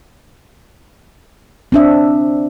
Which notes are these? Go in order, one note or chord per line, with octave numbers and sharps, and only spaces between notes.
C4 D4 E5